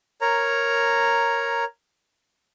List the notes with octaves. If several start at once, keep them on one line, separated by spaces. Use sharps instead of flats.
A#4 C#5 A#5